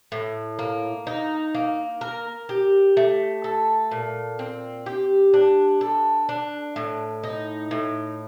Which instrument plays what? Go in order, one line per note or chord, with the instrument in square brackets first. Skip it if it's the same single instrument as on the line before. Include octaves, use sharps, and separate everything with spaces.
[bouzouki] A2
A#3
D#4
A#3
A#4
G4
A3
A4
A#2
C4
G4
D4
A4
D4
A2
D#4
A2